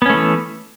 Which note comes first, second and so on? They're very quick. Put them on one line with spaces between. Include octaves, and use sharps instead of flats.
B3 C#4 A3 E3